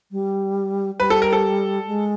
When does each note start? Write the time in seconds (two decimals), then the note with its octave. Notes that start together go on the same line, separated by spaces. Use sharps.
0.11 G3
1.00 G3 B4
1.10 A4
1.22 A#4
1.33 A4
1.87 G#3